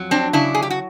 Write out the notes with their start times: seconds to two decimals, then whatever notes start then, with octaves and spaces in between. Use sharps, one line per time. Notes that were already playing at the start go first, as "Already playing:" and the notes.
Already playing: F2 F#3
0.11 C4 D4
0.33 C#3 D4 E4
0.55 G#4
0.62 G4
0.70 F#4